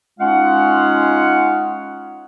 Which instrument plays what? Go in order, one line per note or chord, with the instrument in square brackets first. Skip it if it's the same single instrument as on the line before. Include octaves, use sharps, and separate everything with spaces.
[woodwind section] G#3 C#4 D#4 F4 F5 F#5